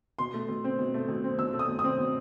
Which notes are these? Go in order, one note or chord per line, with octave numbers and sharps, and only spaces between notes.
B2 C6
A3
B2
C4
B2
A3
B2
C4
B2 E6
A3
D#6
B2
D#6
C4
B2